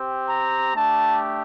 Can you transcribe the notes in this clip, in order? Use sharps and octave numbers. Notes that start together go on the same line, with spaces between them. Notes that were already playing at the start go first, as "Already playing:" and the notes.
Already playing: C4 G4
A#5
A3 D4 G4 A5